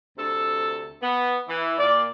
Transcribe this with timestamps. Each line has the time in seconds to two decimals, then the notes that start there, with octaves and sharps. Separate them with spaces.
0.18 D2 C3 A4
1.02 B3
1.48 E3
1.78 A#2 D5